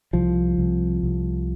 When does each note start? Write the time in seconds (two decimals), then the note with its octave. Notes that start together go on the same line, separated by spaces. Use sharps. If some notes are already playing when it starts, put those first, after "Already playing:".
0.13 C2 F3
0.58 C2
1.03 C2